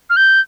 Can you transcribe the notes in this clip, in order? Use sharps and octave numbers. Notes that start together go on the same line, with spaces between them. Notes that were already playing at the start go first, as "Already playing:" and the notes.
F6
G6